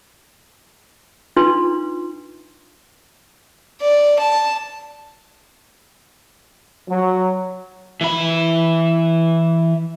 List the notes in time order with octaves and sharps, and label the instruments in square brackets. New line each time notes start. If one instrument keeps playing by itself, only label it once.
[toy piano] D4 D#4 F4 B4 C6
[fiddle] D5
A5
[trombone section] F#3
[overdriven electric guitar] E3 B5